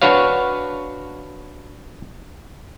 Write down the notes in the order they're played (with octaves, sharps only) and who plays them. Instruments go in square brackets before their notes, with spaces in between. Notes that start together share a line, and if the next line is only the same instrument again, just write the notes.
[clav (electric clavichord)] D4 F#4 B4 C#5 F5